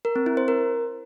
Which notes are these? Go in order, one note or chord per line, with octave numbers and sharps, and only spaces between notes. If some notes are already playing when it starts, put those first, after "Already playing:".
A#4
C4
E4
C5
A#4